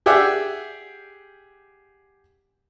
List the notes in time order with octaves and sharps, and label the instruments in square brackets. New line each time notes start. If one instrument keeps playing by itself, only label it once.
[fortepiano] G4 G#4 D5 E5 F#5 G5